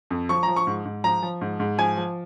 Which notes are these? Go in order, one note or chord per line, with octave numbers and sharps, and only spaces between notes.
F2
F3 C#6
F3 A#5
C#6
G#2
G#2
F3 A#5
F3
G#2
G#2
F3 G#5
F3